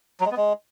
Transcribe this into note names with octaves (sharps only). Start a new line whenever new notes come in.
F#3
G#3
B3
G#3